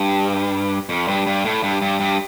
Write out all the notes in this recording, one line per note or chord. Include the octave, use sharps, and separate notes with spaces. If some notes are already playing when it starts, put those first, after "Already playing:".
Already playing: G2
F2
G2
G2
A2
G2
G2
G2